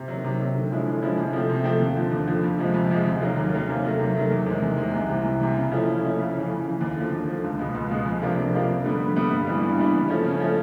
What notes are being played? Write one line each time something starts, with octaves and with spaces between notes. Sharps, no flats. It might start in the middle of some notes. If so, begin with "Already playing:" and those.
Already playing: C3
D#3 F#3
C3
D#3 F#3
D3
F3 G#3 C#4 E4
D3
F3 G#3 C#4 E4
C3
F3 A3 C4
C3
F3 A3 C4
D#2
D3 F3
D#2
D3 F3
F2
C3 F3 G#3
F2
C3 F3 G#3
D#2
D#3 F#3 A#3 C#4
D#2
D#3 F#3 A#3 C#4
C3
D#3 F#3 A3
C3
D#3 F#3 A3
E2
C3 D#3 G#3
E2
C3 D#3 G#3
C2
C3 E3
C2
C3 E3
C#3
F3 A3 C#4 E4
C#3
F3 A3 C#4 E4
F2
C#3 E3
F2
C#3 E3
D#2
D3 F3
D#2
D3 F3
C#2
B2 G#3 B3
C#2
B2 G#3 B3
F2
C3 F3 A#3 D4
F2
C3 F3 A#3 D4
F2
D3 G3 B3
F2
D3 G3 B3
G2
E3 G3 B3 D4
G2
E3 G3 B3 D4
C#3
F3 A3 C#4
C#3
F3 A3 C#4